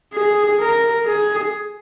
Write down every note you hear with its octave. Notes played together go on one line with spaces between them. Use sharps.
G#4
A#4
G#4